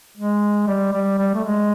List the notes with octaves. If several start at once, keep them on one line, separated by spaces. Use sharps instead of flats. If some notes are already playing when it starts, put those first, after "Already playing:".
G#3
G3
G3
G3
A3
G#3